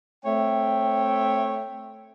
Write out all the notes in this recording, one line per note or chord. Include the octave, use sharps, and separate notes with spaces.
A3 C4 C#5 E5 G5